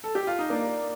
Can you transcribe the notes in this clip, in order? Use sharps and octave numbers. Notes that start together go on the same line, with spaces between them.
A4
G4
F4
D#4
A#3 D4